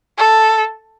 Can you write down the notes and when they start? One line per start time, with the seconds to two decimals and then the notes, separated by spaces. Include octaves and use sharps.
0.18 A4